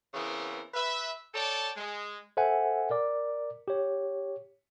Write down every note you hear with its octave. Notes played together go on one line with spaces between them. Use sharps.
C#3 E3 B3 C4 A#4
B4 E5
A4 C#5 D5 G5 A5
G#3
A4 C5 E5 F#5 G#5
A#4 D5 D6
G4 C#5